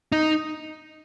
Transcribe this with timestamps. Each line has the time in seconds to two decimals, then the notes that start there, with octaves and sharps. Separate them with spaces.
0.12 D#4